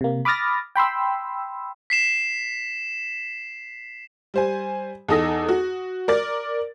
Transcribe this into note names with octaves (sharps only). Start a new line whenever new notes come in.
C3 A#3
B5 D6 D#6 F6 A6 A#6
G5 B5 C6 E6
B6 C7 E7
G3 C5 G#5
E2 D#4 A4 D#6 A#6
F#4
A#4 D5 A6